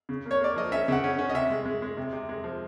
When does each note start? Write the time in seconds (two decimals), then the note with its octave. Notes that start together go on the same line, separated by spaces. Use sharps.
0.09 C#3
0.25 A#3
0.31 C#5
0.41 A#3 D5
0.56 F3 D#5
0.72 C#4 E5
0.88 C#3 F#5
1.04 C#4
1.19 C#4
1.29 D#5
1.34 C3 E5
1.50 G#3
1.65 G#3
1.82 G#3
1.97 C3
2.13 C3
2.29 G#3
2.44 F3